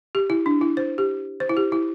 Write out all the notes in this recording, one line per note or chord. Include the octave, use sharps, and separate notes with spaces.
G4
E4
D4
E4
C5
G4
C5
E4
G4
E4